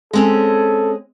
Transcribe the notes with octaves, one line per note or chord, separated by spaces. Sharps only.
G#3 C4 C#4 A4